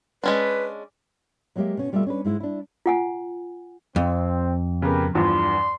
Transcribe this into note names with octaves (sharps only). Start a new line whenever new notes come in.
G#3 C#4 D4 B4
F#3 G#3 A#3 G4 D#5 E5
B2 C#4
B2 G3 A3 E4 F4 E5
C#4 D4 B4
G#2 G#3 E4
D4 E4
F4 F#5 G#5
F2 C4
C#3 B3 G4 A#4 B4
E2 G2 F3 D5 C6